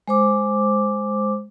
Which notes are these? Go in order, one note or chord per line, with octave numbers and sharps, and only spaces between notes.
G#3 C5 D6